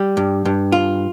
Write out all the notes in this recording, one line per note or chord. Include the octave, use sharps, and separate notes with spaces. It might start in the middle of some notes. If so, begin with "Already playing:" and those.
Already playing: G3 G4
G2
G2
F4